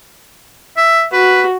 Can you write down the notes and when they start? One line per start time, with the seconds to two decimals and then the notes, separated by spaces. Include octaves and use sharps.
0.77 E5
1.13 F#4 B4